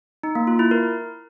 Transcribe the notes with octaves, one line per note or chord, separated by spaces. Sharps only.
D#4
A#3
F4
E4
A#4